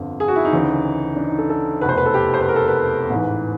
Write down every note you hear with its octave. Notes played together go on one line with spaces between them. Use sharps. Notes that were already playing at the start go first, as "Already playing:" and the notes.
Already playing: G1 F2 D3
G#4
F#4
E4
D#4
D2 C#3 E3
D4
D#4
A4
A4
F1 E2 B2 B4
C5
B4
A4
G4
C5
B4
A#4
A4
B4
A1 G#2 E3